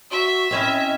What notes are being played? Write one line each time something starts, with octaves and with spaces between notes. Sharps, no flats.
F#4 E5
C4 C#4 E4 D#5